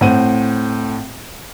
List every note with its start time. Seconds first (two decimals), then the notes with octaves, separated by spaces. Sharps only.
0.01 A2 C4 F#5 D#7